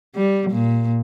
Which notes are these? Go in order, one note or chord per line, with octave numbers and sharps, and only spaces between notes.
G3
A#2